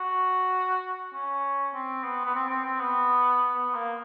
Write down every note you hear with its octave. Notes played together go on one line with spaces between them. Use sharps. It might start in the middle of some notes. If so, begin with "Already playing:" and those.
Already playing: F#4
C#4
C4
B3
B3
C4
C4
C4
B3
B3
A#3